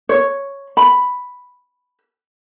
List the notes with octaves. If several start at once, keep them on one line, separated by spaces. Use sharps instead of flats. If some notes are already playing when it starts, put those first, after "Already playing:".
C#5
B5